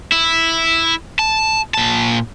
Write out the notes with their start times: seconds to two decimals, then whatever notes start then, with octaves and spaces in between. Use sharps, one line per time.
0.12 E4
1.19 A5
1.74 A#2 A5